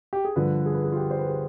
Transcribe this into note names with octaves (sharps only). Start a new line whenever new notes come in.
G4
G#4
G2 D3 F3 B4
G#4
B4
G#4
F4
G4
C5
B4
G#4